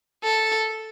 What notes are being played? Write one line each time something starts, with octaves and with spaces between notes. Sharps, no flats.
A4